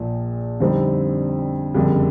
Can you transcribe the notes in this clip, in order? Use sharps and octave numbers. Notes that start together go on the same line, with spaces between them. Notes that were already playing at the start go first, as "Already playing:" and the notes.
Already playing: A#1 A#2 F3
F2 D3 G3 C4 D#4
F#1 F2 D3 G3